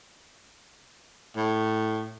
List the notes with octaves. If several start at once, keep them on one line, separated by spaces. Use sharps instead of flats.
A2